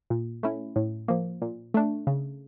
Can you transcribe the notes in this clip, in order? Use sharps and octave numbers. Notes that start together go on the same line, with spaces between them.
A#2
A3 C#4 E4
A2
F3 A#3
A#2
A3 D4
C#3